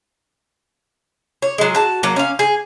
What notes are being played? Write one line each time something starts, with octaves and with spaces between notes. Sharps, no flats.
C#5
F#3 G#3
F#4 A5
F#3 A#3
C#4 F5
G#4